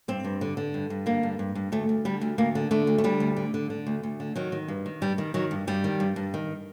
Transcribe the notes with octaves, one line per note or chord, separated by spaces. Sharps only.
G2 C4
G2
D3
D3
G2
G2
D3 A#3
G2
G2
G2
D2 A3
D2
D3 G3
D2
D2 A#3
D3
D3 A3
D2
A3
D3 G3
D2
D3
D3
D3
D2
D2
D3
D#3 F#3
D#3
G2
D#3
G2 G3
D#3
D#3 F#3
G2
G2 G3
D#3
G2
G2
D#3